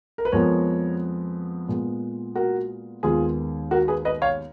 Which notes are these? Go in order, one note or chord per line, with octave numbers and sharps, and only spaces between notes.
A#4
B4
F2 F3 G#3 B3 A#4 C#5
A#2 G#3 B3
F#4 A#4
D#2 D#3 G#3 B3 F4 G#4
F#4 A#4
G#4 B4
B4 D#5
C#5 F5